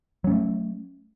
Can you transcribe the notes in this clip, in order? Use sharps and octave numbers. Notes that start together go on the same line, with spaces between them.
F#3 A3 C#4